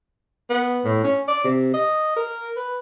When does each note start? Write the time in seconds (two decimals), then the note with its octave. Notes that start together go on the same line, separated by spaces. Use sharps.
0.49 B3
0.85 A2
1.04 C#4
1.28 D5
1.44 C3
1.74 D#5
2.17 A#4
2.56 B4